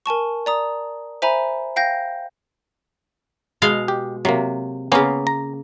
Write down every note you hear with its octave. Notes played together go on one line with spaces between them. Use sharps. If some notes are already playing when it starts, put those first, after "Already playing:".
A#4 G#5 A5 C#6
D5 A#5 D#6
C5 E5 G#5 A#5 B5
F5 G5 G6 A#6
B2 G#3 F5
G4
C3 F#3 A#3
C#3 A#3 B3 C#4
A#5